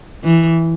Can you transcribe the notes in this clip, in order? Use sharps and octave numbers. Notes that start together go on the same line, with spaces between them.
E3